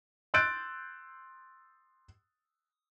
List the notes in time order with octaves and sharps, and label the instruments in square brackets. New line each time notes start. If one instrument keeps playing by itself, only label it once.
[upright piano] C6 E6 F#6 G6 A6 D7